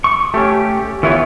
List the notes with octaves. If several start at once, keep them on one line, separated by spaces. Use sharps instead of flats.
C#6
A3 C#4 G4
E3 B3 F4 B4 C#5